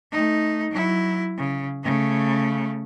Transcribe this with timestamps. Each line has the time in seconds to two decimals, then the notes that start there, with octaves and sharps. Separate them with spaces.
0.12 A3 D#4
0.71 F#3 E4
1.38 C#3
1.83 C#3 A3